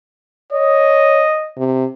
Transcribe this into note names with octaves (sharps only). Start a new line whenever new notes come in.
C#5 D#5
C3